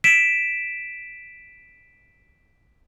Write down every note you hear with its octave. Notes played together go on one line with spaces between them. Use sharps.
B6 D7 E7